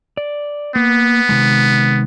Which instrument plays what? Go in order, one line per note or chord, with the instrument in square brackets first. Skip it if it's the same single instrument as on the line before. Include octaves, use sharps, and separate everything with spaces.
[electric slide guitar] D5
[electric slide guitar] A#3 [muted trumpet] B3
[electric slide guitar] C3 D#3 G#3